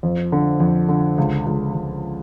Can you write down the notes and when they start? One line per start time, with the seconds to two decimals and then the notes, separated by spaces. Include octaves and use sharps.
0.03 F2
0.32 D3
0.60 F2
0.88 D3
1.18 C#2
1.46 C#2
1.74 C#2